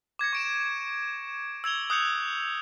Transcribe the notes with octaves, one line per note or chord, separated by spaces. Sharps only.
D6 G#6 A#6 C#7
C#6 D7 E7
E6 G#6 F7 G7
D#6 F#6 G6 C#7 F7